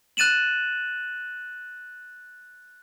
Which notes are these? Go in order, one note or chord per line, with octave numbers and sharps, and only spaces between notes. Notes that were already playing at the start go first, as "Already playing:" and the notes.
F#6 A6 D#7 E7 F#7